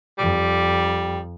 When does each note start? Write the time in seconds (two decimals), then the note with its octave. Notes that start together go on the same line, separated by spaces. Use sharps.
0.19 F2 G3